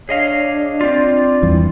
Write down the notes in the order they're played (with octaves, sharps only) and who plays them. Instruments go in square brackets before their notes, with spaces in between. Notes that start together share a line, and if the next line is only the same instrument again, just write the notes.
[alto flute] D4 [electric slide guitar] G#4 D#5 F5 [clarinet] C#5
[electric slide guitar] C4 F4 [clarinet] D5
[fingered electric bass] E2 G2 E3